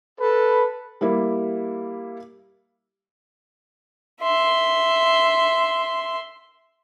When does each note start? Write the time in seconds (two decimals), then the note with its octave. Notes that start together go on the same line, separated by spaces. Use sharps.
0.20 A4 B4
1.01 G3 A#3 E4
4.21 E5 C6